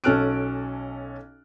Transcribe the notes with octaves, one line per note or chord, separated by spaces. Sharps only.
B1 C#4 A4 F6 F#6 D7